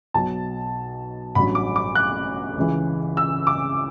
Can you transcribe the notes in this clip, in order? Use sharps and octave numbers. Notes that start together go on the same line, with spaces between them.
B1 B2 F#3 A5
A1 G2 F#3 B5
D6
D6
F#6
C#2 C#3 E3
E6
D6